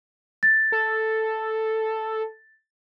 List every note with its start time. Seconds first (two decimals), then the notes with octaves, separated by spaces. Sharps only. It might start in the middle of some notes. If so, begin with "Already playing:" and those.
0.43 A6
0.72 A4